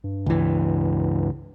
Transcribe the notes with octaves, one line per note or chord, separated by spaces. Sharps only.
G2
C#2 E3